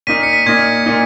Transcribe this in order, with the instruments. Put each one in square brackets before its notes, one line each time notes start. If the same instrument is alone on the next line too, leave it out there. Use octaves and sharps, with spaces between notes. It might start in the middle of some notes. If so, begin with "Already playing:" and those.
[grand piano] A#2 A#3 D#4 [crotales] B6 D#7
[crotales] C#7
B6
[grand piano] A#2 A#3 D#4 [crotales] G#6
[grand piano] A#2 A#3 D#4